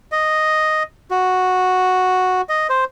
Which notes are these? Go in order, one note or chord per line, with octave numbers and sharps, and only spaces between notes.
D#5
F#4
D#5
C5